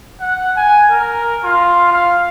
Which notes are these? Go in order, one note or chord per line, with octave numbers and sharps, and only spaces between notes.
F#5
G#5
A#4
F4
F5